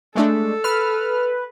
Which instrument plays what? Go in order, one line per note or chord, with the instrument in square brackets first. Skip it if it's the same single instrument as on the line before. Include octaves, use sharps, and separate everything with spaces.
[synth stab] G#3 A3 D4 [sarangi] A4
[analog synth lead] B4 [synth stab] F6